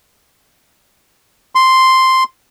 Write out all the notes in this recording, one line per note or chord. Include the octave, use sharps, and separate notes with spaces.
C6